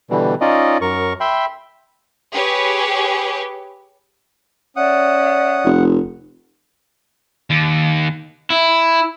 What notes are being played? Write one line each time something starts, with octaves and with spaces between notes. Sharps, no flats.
B2 D3 E3 G3
C#4 D#4 F4 D5 D#5
F#2 A#4 C#6
E5 G5 B5 C6
G4 G#4 B4 C#5
C#4 D5 E5 F#5 D#6
F1
D#2
E4